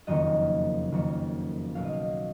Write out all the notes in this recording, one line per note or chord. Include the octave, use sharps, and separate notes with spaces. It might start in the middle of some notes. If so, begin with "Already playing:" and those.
F#1 F2 D#3 A#3 C#4 D#5
F#1 F2 D#3 A#3 C#4
B1 B2 F#3 F5
D#5
F5